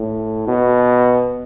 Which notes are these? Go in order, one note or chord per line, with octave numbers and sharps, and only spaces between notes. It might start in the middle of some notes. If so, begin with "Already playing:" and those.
Already playing: A2
B2